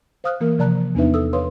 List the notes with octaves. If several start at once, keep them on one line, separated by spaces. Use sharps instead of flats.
C5 F5 D#6 F6 F#6
E3 A#3 A#4
C3 F3 D5 A5 A#5 F#6
E2 B3 D4 D#4 B4 E5
A4 D#6 E6
B4 C#5 F5 C6 D#6